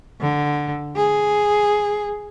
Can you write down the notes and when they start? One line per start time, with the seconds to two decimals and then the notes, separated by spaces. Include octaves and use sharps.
0.21 D3
0.96 G#4